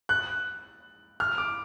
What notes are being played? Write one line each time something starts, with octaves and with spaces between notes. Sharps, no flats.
F#6
F6
D6